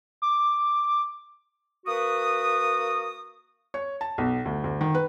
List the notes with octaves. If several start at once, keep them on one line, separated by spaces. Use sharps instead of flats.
D6
A#3 F#4 B4 D#6
C#5
A5
B1
D2
D2
D#3
B4